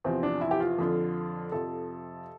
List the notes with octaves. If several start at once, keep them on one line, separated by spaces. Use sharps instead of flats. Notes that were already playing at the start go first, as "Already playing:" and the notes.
E2 C3 F3 C4
D4
E4
G4
F4
F2 D3 F3
F2 C3 F3 A4